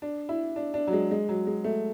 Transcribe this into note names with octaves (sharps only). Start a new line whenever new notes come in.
D4
E4
D4
D4
F#3
G#3
G#3
F#3
G#3
A3